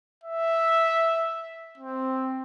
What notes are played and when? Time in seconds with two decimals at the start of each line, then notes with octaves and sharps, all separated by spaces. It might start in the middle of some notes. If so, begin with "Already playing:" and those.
0.24 E5
1.78 C4